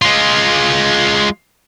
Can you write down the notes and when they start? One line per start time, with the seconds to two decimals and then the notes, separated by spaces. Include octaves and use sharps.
0.02 G#3 F4